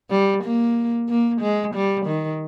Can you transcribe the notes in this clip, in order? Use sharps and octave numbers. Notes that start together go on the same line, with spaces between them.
G3
A#3
A#3
G#3
G3
D#3